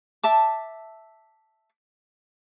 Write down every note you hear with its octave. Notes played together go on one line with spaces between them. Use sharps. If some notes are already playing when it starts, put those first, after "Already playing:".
E5 A5 D6